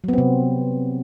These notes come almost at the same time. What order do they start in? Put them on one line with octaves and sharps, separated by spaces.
F#3 B3 C4 C3